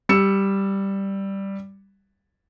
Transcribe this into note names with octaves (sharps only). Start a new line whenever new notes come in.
G3 E6 C#7 E7